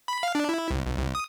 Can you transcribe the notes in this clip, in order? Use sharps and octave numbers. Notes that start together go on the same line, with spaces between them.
B5
F5
D4
E4
C2
B1
C2
D#6